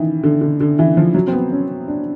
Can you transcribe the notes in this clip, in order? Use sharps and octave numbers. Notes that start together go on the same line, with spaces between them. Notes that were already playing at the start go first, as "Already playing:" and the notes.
Already playing: D#3 E3
D3
D3
D3
E3
F3
F#3
C4
B3
C#4
D4